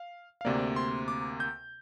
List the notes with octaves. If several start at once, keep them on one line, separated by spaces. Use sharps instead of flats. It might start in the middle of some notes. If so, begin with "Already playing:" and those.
Already playing: F5
F5
D2 C3 A#3 D5
C6
D6
G6